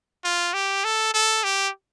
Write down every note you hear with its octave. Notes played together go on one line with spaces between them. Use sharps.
F4
G4
A4
A4
G4